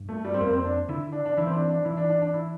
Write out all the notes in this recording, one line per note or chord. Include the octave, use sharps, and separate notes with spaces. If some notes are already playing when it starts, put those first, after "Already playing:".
Already playing: G2
A3
G3
C4
F2 A#3
C4
D4
D3 E4
D4
D4
E3 E4
C4
D4
D4
E3 E4
D4
D4
D4
E4